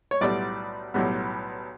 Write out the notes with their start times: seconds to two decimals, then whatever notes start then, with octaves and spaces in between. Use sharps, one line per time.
0.11 C#5
0.21 B1 A2 G3 B3 D5
0.94 B1 A2 G3 B3